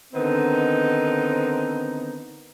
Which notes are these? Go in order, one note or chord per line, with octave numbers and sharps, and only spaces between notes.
D3 D#3 B3 C4 D#4